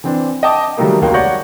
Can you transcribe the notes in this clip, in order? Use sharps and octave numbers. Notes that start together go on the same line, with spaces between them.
E3 C4 D4
D#5 G5 A5 D6 D#6
D#3 F#3 G3 A3 A#3 G4
E1 C#2 A#3 F#4 G5
C#5 D5 F#5 C#6 G6 A#6